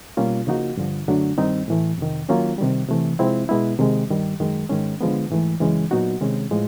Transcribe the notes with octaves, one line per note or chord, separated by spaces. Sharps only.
B2 G3 A#3 C#4 F4
C#3 F3 A#3 D#4 F#4
G2 D3 F3
F#2 D3 F#3 A3 D4
G2 D#3 G3 C4 D#4
A2 E3 A3
F2 C3 D#3
D#3 F#3 A#3 C#4 F4
C3 D#3 G3
C3 E3 A3
C3 F3 G#3 C4 E4
B2 G#3 B3 E4
C3 D#3 G#3
G2 D#3 G3
F#2 D#3 G#3
G#2 D#3 G#3 C#4
D3 F3 G#3 B3
G#2 E3 A3
F#2 C#3 E3 G#3 C#4
A#2 F#3 B3 D#4 F#4
C3 D#3 G#3 C#4
A2 F3 G#3